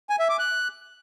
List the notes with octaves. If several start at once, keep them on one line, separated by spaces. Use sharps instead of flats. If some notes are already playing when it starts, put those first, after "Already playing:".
G#5
E5
D6
F#6